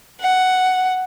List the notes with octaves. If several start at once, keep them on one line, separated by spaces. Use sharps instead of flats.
F#5